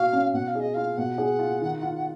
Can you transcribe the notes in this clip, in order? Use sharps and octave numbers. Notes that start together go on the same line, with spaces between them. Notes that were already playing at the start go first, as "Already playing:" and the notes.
Already playing: B2 F#4 F5
C#4
B2 F#5
F5
G#4 D#5
F4 F5
B2 F#5
G#4
F4
D#3
F4